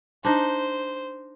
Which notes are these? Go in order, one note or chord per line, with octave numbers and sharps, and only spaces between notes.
D4 D#4 C5